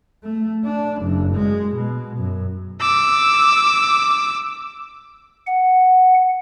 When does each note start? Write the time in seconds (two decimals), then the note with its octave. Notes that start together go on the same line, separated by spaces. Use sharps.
0.24 A3
0.65 D4
1.01 F#1
1.35 G#3
1.75 B2
2.18 F#2
2.80 D6 E6
5.47 F#5